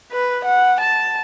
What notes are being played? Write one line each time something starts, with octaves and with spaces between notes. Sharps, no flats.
B4
F#5
A5